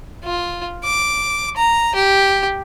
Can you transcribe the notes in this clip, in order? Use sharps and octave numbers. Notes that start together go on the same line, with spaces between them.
F4
D6
A#5
G4